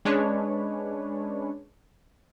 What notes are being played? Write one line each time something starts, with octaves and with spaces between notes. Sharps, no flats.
G#3 C#4 D4 B4 C#5